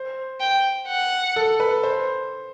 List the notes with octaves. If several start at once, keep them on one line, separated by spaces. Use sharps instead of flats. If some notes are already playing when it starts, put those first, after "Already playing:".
Already playing: C5
G5
F#5
A4
B4
C5